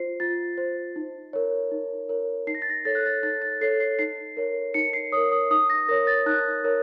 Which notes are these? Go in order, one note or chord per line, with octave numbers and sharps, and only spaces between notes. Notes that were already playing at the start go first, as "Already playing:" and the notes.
Already playing: F4 C5 C7
F4 A6
C5
D#4
A#4 C#5
D#4
A#4 C#5
D#4 C7
A#6
A6
A#6
A4 C#5 A6
F#6
A6
D#4 A6
A6
A4 C#5 C7
C7
D#4 C7
A#4 C#5
D#4 C#7
C7
A#4 C#5 D#6
D#6
D#4 D#6
A#6
A#4 C#5 A#6
A6
D#4 F#6
A#4 C#5